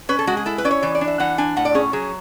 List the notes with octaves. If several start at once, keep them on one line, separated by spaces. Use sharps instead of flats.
C#4 B4
A4
G#3 F#4
G#4
E4 A4
B4
C#4 D5
C#5
E3 D5
D5
D4
E5
E3 F#5
D4 G#5
A2 F#5
D5
C#4 G#4
F#3 G#4